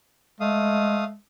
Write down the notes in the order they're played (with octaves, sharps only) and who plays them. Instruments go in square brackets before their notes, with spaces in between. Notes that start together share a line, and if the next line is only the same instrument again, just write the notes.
[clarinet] G#3 [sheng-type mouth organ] A3 F5 D#6